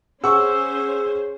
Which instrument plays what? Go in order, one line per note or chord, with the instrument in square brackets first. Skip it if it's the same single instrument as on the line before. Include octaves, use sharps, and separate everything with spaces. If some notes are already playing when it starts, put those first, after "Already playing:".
[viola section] C#4 C5 [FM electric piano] G#4 [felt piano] F#5 C#6 [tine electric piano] E6